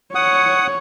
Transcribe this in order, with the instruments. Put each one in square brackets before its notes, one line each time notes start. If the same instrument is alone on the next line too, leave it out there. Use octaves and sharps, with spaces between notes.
[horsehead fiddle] C#5 [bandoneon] F#5 D#6